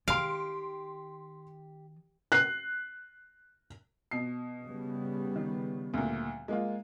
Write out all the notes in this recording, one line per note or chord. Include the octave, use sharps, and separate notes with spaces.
D#3 G4 F5 C6 D7
F#6 C7
B2 C7
C#3 G3 B3
D#3
D2 A#2
G#3 A#3 F4